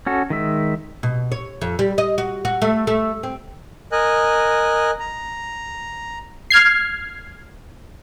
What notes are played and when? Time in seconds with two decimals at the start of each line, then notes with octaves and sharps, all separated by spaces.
0.06 C#4 F#4 A4
0.30 D#3 G#3 E5
1.03 B2
1.32 C#5
1.62 F2
1.79 G3
1.98 D#5
2.18 F#4
2.45 F#4
2.62 A3
2.87 A3
3.23 C4
3.92 A#4 D#5 G#5 F#6
5.00 A#5
6.50 F6 G#6 C7